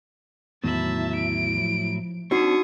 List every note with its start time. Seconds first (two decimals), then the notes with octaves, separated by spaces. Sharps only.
0.64 E2 A2 D#3 F#3 B3 E4 E5 A5
1.16 D7
1.57 F3
2.31 C4 D4 D#4 F#4 C#6 D#6 C7